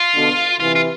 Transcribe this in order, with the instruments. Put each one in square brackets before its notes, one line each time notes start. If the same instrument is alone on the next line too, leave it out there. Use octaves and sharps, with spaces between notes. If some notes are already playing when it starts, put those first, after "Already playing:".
Already playing: [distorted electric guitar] F4
[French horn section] B2 D3
[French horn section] C3 E3 [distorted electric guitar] F4
[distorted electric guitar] F4